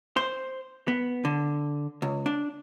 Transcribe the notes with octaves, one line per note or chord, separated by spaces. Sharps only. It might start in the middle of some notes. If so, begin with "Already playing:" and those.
C5
B3
D3
C#2
D4